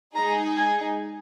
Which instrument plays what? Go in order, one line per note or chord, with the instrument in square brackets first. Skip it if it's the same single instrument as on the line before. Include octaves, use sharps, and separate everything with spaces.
[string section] G#3 D#4 G#4 [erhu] A#5
[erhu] G#5